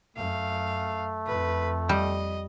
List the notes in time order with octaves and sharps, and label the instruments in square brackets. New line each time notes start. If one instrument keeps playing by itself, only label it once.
[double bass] F#2 [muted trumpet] A3 [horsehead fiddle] F5
[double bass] F2 [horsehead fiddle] B4
[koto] G3 [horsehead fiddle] D#5